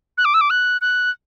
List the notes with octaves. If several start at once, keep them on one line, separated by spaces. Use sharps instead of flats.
F#6
D6
E6
D6
F#6
F#6